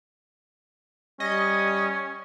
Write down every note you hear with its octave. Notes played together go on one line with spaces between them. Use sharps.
G3 C#4 D#5